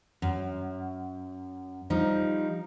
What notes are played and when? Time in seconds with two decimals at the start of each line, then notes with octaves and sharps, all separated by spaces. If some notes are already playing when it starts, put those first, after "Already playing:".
0.22 F#2
1.90 F3 G3 D#4